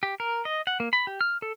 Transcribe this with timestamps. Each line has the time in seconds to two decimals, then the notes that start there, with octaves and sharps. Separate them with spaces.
0.03 G4
0.20 A#4
0.45 D#5
0.67 F#5
0.80 A#3
0.93 B5
1.07 G4
1.21 F6
1.42 A4